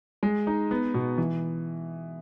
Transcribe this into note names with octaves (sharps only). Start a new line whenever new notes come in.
G#3
D#4
B3
B2
E3